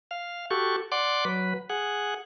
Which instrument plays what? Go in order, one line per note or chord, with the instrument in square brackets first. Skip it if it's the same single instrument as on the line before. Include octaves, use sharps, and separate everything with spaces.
[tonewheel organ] F5
F#4 G4 A4 C#6
D5 F#5 C6 D6
F#3 B4
G#4 F#5